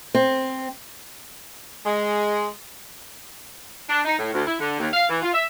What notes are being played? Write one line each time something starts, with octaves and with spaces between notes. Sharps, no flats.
C4
G#3
D4
D#4
A2
D2
E4
D3
D#2
F5
E3
F4
E5